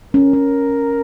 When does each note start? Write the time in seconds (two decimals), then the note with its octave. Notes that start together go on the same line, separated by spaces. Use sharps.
0.14 C#4 A#4
0.33 C#4